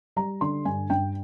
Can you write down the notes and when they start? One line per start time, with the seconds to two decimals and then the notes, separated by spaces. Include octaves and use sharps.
0.16 G3 A#5
0.41 D3 C6
0.65 G2 G#5
0.90 G2 G5